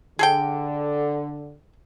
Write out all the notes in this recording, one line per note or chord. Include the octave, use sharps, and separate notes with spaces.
D3 G#4 A4 G5